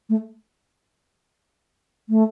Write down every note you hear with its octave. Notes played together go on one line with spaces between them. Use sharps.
A3
A3